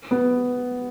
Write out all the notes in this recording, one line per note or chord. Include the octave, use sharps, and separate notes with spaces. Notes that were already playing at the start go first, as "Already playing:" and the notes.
B3